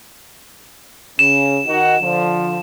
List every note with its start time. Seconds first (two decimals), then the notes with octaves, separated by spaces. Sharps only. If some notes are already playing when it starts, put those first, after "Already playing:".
1.19 C#3 E7
1.66 D#3 D#4 F#4
2.01 D3 F3